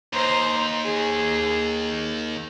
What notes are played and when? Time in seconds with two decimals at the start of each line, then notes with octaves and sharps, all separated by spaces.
0.13 D#2 C5 A#5
0.85 G#4